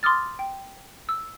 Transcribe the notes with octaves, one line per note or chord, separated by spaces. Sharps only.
C6 D6 D#6 F6 A6
G5
E6